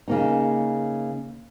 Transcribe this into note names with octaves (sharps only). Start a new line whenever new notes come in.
C#3 A#3 D#4